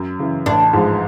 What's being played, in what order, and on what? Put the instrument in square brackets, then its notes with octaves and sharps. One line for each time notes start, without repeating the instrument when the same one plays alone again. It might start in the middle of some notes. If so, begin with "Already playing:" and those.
Already playing: [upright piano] F#2
C#3 E3
[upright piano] A1 [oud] D4
[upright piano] G#2 F3 G#3